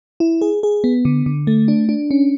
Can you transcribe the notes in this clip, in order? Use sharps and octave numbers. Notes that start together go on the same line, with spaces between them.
E4
G#4
G#4
B3
D3
D3
A3
D4
D4
C#4